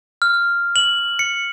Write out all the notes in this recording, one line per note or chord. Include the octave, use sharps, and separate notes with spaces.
F6
F#7
C#7